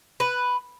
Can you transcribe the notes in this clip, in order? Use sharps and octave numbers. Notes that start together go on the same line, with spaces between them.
B4